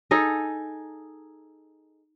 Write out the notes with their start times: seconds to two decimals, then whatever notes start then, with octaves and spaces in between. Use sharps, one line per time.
0.11 D#4 G#4 A4 D#5